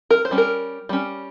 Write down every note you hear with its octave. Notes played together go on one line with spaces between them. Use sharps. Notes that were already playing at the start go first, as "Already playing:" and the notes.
A#4
C5
G3 C#4
A#4
G3 C#4